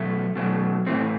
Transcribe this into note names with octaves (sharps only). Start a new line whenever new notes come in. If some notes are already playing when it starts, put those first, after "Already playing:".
Already playing: B2 F#3 A3
B2 F#3 A3
A2 E3 A3 C4